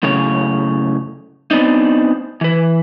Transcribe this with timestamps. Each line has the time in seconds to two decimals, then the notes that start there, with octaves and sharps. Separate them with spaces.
0.03 F#2 A2 C#3 C#5
1.51 B3 C4 D4 D#4
2.41 E3 B4